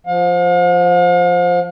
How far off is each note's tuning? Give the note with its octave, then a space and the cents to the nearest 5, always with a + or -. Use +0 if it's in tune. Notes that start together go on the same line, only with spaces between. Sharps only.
F3 +0 F5 +40